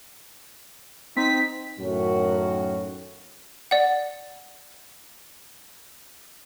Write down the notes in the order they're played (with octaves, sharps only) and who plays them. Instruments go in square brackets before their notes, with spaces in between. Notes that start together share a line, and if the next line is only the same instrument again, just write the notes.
[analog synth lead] C4 [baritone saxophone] D#4 [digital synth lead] B6
[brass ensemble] F#2 A2 D#3 F#3 C#4 F#4
[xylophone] D5 F#5